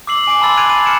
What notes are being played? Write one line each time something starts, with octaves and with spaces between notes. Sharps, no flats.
D6 E6 C7 F#7
G#5 D6 D7
A5 B5 C6 E6 A6
F#6 G#6 C7 D7 D#7 F7
D#7
F6 C#7 D7 E7